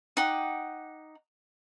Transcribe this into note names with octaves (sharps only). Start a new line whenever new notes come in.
D#4 F#5 G5 D6